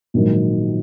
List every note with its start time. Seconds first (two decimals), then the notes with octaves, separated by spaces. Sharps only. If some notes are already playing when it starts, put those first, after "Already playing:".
0.14 A#1 G#2 D#3 F#3